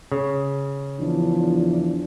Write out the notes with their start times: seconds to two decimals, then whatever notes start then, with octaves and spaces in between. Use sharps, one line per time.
0.12 C#3
0.99 E2 F3 D4